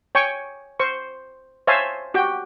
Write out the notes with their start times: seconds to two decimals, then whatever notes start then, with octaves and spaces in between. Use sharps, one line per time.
0.15 C#5 G5 G#5 C#6
0.80 C5 C#6
1.67 C5 C#5 E5 F5 G#5 A5
2.14 F#4 G4 G5